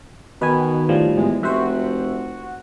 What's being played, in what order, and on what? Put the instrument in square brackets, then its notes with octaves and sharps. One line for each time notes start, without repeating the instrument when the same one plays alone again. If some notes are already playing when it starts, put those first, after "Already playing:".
[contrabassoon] B2 [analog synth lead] D#3 [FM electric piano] B4 G#5
[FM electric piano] A2 F3 G3
[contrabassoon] E2 [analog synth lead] G#3
[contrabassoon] F1 [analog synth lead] F#4 [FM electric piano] C5 E5